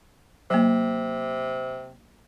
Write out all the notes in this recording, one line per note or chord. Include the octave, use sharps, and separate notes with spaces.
C3 F#3 A#3